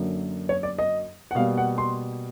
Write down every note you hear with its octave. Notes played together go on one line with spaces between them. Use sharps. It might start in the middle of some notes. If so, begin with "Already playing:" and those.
Already playing: F#2 D3 F#3 A#3
C#5
D5
D#5
F#5
B2 G3 A#3 F5
F#5
C6